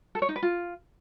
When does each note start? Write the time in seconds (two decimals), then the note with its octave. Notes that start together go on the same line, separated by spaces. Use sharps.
0.15 A4
0.22 C#5
0.29 D#4
0.36 B4
0.43 F4